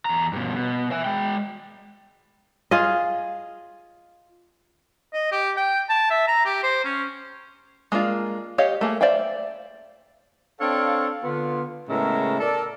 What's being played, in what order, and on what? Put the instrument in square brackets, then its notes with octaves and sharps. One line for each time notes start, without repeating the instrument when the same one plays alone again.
[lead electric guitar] E2 A#5
G2 B2
B2
E5 G#5
G#3 G5
[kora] F4 G#4 D#5
[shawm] D#5
G4
G5
A5
E5
A#5
G4
C5
C#4
[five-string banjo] G#3 A#3 D4 F4
G4 C#5 D#5 F5 F#5
A3 A#3 G#4
C5 D5 E5 F5 G5
[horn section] C4 D4 A4 C#5 F5
D3 B3 F4
A2 C#3 G#3 B3 A#4 E5
A4 A#4 D5